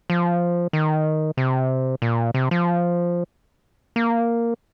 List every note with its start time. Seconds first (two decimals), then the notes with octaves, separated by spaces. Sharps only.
0.10 F3
0.73 D#3
1.37 C3
2.02 A#2
2.34 C3
2.51 F3
3.96 A#3